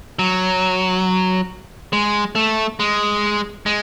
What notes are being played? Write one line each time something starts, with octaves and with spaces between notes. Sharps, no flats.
F#3
G#3
A3
G#3
G#3